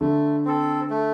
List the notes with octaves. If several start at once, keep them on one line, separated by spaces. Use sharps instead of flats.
D3 A3
C4 A4
A3